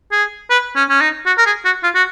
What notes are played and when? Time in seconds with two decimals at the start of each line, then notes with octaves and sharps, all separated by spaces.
0.12 G#4
0.50 B4
0.76 C#4
0.89 C#4
1.01 D#4
1.26 F#4
1.38 A#4
1.46 G#4
1.65 F#4
1.83 F4
1.95 F#4